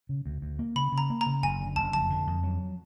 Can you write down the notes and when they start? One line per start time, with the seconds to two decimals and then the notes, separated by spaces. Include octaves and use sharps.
0.09 C#3
0.26 D2
0.42 D2
0.59 A#3
0.76 C#3 B5
0.92 C#3
0.98 A#5
1.10 A#3
1.21 A#5
1.26 C#3
1.43 F#1 G#5
1.60 D3
1.76 F#1 A5
1.93 F2 A5
2.10 D3
2.27 F2
2.43 F#3